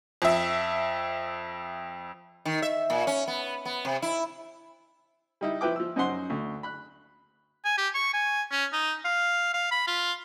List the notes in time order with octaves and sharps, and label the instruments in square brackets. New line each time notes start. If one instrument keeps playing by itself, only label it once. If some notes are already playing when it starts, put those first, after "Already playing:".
[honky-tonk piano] F2 E5
[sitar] D#3
E5
A#2
C#4
B3
B3
C3
E4
[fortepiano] G3 D#4 E4
F3 E4 B4 G5 D6
F3 E6
F#2 D#4 C5 F#5 C6
D2
B5 F#6
[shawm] G#5
G4
C#6
G#5
C#4
D#4
F5
F5
B5
F4